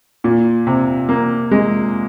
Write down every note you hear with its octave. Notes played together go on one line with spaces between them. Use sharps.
A#2
C3
A#3
G#3